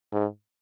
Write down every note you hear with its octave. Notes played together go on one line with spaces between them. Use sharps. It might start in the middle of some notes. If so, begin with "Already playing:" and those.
G#2